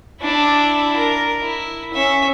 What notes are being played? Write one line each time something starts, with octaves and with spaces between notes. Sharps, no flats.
D4 E4
A#4
E4
C#4 E5